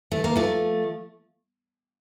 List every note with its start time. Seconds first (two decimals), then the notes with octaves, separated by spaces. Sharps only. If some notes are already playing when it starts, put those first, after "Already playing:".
0.12 A3
0.24 A#3
0.36 F3 A3